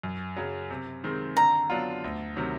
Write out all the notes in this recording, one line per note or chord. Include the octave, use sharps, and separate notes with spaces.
F#2
C#3 F#3
C3
D#3 G#3 C4
D3 A#5
F#3 B3 D4 F4
D2
C3 D#3 F#3